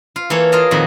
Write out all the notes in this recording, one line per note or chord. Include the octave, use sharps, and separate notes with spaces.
F4
E3 A#3 A4 C#5
F4 G#4 A#4 D#5 A5 A#5
F2 A#2 D#3 F#4 B5